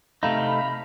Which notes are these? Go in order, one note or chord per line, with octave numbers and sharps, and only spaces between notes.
C3 A3 D#4 F5 B5